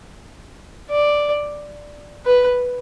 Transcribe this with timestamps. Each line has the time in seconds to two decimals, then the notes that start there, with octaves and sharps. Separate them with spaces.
0.90 D5
2.25 B4